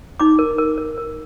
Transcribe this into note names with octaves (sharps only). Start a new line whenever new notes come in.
D#4 D6
A#4
A#4
A#4
A#4